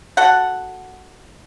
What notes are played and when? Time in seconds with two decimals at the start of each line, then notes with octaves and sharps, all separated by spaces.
0.17 F#4 A4 F#5